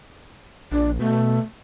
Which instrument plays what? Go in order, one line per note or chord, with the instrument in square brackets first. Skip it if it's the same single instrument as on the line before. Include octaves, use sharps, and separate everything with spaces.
[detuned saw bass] A#1 [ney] D4
[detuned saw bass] B2 [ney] A3